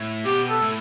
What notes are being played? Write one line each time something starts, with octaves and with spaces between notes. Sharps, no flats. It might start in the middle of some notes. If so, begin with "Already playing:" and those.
Already playing: A2
B2 G4
A4
A2